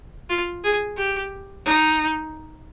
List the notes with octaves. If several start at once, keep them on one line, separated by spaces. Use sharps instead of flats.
F4
G#4
G4
D#4